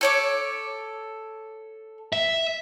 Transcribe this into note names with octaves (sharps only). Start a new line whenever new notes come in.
A4 C#5 D6
E5